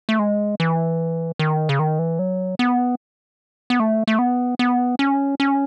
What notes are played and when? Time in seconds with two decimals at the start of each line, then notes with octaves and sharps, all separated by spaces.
0.09 A3
0.19 G#3
0.60 E3
1.39 D#3
1.69 C#3
1.79 D#3
1.99 E3
2.19 F#3
2.59 B3
3.70 B3
3.80 A3
4.07 A3
4.19 B3
4.59 B3
4.99 C#4
5.40 C#4